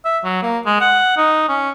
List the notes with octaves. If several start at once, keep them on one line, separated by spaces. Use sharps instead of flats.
E5
F#3
A#3
G#3
F#5
D#4
C#4